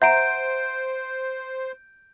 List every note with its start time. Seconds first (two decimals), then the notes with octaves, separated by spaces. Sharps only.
0.02 C5 E5 F#5 A#5 G6 D7